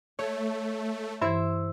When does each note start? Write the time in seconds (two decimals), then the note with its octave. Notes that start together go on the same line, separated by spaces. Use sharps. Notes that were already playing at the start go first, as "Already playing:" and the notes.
0.19 A3 C#5
1.22 G2 E3 E4 C5 E5